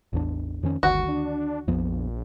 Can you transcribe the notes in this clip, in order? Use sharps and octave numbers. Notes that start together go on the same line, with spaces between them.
A1 E2 D4
F2 D#3 C#4
G1 D2 D#3 F#4
D4
A#1 F2 F3 B3